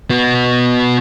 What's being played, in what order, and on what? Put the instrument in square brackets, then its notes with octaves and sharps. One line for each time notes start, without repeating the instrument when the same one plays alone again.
[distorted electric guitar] B3 F#4